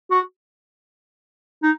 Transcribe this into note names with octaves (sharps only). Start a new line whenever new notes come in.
F#4
D#4